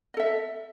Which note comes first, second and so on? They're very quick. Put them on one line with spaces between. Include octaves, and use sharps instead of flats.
D#5 A4 E5